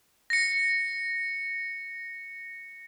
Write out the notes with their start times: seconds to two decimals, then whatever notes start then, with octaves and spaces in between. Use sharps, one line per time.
0.30 A#6 C#7